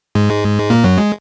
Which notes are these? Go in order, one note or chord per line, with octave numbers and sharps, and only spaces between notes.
G#2 G#3
A#2 A#3
F#2 F#3
G#3